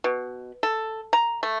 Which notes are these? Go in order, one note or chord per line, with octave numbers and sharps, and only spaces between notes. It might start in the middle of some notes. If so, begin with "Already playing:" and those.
B2
A4
A#5
A3